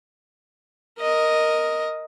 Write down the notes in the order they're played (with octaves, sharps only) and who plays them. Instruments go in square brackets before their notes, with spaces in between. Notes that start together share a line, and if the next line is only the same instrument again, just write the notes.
[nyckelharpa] A#4 D#5